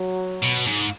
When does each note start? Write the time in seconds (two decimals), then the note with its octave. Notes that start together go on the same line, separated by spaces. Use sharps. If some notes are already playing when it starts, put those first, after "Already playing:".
Already playing: F#3
0.43 B2
0.66 G#2